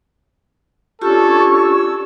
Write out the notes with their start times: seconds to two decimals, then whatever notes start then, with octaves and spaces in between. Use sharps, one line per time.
1.02 C#4 D4 F4 G4 A4 C#6
1.53 E6